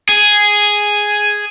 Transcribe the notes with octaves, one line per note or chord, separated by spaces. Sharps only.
G#4